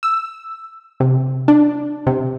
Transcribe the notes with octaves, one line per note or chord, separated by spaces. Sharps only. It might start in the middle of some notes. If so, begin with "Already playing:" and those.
E6
C3
D4
C3